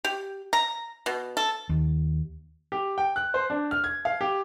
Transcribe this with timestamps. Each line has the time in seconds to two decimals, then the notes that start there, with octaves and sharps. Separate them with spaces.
0.05 G4
0.53 A#5
1.06 B2
1.37 A4
1.69 D#2
2.72 G4
2.98 G5
3.16 F#6
3.34 C5
3.50 D4
3.71 F6
3.84 G#6
4.05 F5
4.21 G4